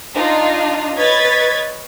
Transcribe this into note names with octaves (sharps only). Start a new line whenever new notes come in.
D4 D#4 F4
B4 C#5 D#5 G#6 A6 B6